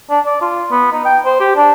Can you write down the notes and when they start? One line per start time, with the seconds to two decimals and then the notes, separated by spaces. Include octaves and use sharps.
0.10 D4
0.26 D5
0.41 F4
0.71 B3
0.92 D#4
1.05 G5
1.25 C5
1.40 G4
1.56 D4